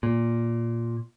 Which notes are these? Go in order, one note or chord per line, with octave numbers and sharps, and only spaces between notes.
A#2